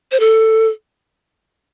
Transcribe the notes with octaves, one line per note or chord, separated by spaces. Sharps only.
C5
A4